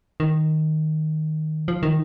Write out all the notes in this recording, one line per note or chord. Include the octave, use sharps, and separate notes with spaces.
D#3
F3
D#3